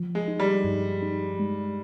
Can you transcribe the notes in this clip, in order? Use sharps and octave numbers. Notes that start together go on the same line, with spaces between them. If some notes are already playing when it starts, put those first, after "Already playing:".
Already playing: F3
G#3
D#4
G3
G2
D#4
G#3